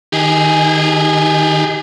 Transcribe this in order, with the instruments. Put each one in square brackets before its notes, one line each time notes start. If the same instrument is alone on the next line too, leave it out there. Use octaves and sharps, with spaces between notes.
[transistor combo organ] D#3 [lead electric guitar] G4 G#4